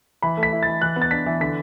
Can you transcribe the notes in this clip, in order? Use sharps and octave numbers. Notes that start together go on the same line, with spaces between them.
E3 B5
A3
B6
E4
E3 A6
E3 F#6
B3
A6
D4 B6
E3
D3 B6